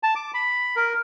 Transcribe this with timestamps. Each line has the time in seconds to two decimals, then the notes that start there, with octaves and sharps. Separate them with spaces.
0.03 A5
0.15 D6
0.34 B5
0.76 A#4